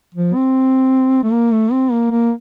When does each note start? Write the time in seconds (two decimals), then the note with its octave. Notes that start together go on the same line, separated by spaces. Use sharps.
0.15 F3
0.35 C4
1.23 A3
1.33 A#3
1.53 A3
1.72 C4
1.92 A#3
2.11 A#3